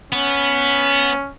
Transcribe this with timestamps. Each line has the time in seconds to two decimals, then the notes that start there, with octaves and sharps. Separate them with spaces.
0.12 B3 C#4